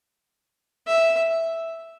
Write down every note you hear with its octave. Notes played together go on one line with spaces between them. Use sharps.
E5